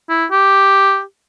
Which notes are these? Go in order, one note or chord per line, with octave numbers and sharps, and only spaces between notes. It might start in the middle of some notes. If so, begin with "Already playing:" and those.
E4
G4